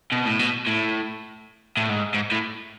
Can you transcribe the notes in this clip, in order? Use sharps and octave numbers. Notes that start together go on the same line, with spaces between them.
B2
A2
B2
A2
A2
G#2
G#2
A2